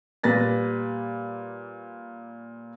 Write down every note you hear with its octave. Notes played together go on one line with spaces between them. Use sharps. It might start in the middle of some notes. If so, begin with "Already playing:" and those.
A#2 G3 B4 A6 A#6